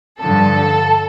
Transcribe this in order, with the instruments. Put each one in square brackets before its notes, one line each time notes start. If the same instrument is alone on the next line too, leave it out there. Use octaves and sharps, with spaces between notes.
[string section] G2 D3 F3 A4